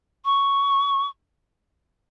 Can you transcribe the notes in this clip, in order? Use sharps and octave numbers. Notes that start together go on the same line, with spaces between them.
C#6